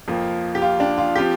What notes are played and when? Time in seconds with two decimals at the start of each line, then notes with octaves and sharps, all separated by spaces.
0.08 F2 F3 A#3
0.55 G4
0.62 F4
0.80 D4
0.98 F4
1.16 F3 C4 G4